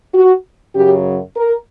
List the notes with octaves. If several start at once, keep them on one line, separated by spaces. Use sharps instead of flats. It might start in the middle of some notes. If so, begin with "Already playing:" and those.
F#4
F#2 C#3 F#3 G4
A#4